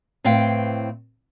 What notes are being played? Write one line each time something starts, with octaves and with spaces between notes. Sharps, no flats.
A2 C4 B4 F5 G5